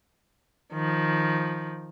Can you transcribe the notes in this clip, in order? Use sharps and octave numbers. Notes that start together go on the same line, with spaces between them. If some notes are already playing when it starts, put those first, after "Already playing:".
D#3 F3